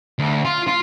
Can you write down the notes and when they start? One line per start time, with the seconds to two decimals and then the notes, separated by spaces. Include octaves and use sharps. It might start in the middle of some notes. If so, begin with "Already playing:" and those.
0.19 D2
0.45 F4
0.67 F4